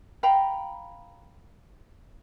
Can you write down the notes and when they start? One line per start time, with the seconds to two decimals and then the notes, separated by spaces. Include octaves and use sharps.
0.23 F5 G5 A#5 B5